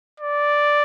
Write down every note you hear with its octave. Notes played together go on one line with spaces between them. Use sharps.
D5